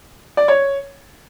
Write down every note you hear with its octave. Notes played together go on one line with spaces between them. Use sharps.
D5
C#5